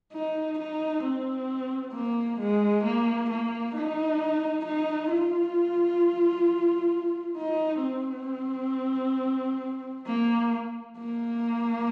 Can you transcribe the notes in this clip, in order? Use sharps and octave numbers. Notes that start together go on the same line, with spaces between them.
D#4
D#4
C4
A#3
G#3
A#3
A#3
D#4
D#4
F4
D#4
C4
A#3
A#3